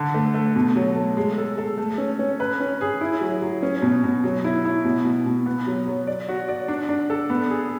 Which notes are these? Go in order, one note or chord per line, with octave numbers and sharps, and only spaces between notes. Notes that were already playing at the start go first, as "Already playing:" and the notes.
Already playing: D3
A3
A3
B2
F#3
A3
G#3
A4
A4
A3
C#4
C#4
B4
C#4
G#4
E4
F#3
F#3
C#4
B2
B2
F#3
E4
E4
B2
B2
B2
B3
F#3
F#3
D5
F#4
D5
D4
D4
A4
B3
G#4